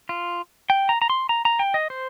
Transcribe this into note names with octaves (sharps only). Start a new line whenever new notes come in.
F4
G5
A#5
A#5
C6
A#5
A#5
G5
D#5
C5